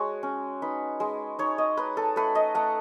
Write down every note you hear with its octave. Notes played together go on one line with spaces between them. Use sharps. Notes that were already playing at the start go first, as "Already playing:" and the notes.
Already playing: G#3 F#4 C#5
C#4
D#4 B4
G#3
D#4 C#5
D#5
D#4 B4
A4
A3 B4
D#5
A3 F#5